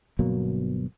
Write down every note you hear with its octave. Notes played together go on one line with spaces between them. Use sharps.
G1 B2 F#3 A#3